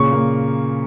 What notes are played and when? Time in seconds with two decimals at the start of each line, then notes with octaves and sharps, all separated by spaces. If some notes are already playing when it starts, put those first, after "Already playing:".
Already playing: A#2 C#3 C#6
0.12 A#3